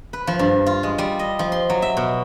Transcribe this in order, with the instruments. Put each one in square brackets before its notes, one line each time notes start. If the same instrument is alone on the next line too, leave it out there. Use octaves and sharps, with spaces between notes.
[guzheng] B4
F3
G2
F4
G#3
G3
D#5
F3
C6
F#3
E5
B2